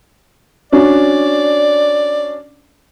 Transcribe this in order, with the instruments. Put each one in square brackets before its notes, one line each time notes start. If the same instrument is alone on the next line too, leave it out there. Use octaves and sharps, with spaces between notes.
[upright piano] C#4 D4 F#4 [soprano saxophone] D5